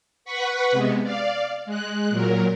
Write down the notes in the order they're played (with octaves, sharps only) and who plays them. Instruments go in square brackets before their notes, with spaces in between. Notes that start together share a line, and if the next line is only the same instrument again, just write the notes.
[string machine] B4 F#5 B5 C#6
C3 G#3 B3
D5 F5
G#3 F#6
A#2 F#3 A#4